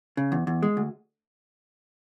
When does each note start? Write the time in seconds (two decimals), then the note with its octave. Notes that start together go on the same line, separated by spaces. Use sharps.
0.17 C#3
0.32 E2
0.47 E2
0.63 G#3
0.77 D2